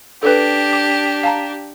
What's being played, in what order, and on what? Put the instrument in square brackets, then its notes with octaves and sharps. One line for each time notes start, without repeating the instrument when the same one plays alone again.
[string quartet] D4 G4 [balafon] A4 B4
[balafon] D6
F5 A5 A#5